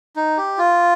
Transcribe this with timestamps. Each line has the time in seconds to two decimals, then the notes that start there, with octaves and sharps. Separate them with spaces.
0.16 D#4
0.37 G4
0.58 F4